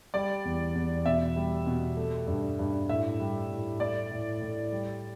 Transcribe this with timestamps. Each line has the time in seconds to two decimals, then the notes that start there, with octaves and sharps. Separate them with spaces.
0.14 G3 D5
0.45 E2
0.75 E2
1.05 B2 E5
1.36 G3
1.66 B2
1.97 A3
2.27 G2
2.59 G2
2.89 A2 E5
3.19 G3
3.50 A2
3.80 A3 D5
4.11 A2
4.41 A2
4.72 G3